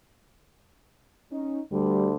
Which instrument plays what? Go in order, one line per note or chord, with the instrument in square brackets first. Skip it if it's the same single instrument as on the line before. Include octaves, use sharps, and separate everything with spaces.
[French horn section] C#4 D#4
[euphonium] D2 [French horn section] G3